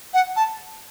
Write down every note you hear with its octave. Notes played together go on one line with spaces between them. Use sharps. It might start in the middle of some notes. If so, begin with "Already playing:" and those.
F#5
A5